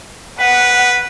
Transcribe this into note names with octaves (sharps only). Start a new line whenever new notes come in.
B4 F#5